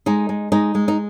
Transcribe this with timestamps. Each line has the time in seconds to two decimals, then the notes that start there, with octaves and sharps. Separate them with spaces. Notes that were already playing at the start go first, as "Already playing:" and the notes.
0.06 G#3 D#4
0.29 G#3
0.52 G#3 D#4
0.75 G#3
0.88 D#4